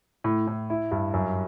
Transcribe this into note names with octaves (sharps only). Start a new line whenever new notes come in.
A2
A2
E4
G2
F#2